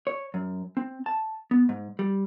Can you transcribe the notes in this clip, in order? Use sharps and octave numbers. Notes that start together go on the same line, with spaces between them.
C#5
F#2
C4
A5
B3
G#2
G3